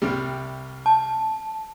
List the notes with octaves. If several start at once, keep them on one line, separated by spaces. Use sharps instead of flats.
C2 C3 G3
A5